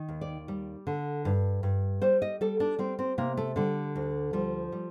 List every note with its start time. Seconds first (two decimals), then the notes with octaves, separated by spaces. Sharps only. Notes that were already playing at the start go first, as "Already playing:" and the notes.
Already playing: D#3
0.08 D#2
0.21 D5
0.48 G3
0.87 D3
1.25 G2
1.63 G2
2.01 G3 C5
2.22 D#5
2.41 G3 A4
2.60 D4
2.79 G3 C4
2.99 C4
3.18 C3 A#3
3.37 A3
3.56 D3 G3
3.96 D2
4.33 F3 G3
4.72 G3